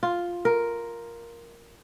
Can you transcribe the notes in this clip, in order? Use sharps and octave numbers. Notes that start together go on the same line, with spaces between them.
F4
A#4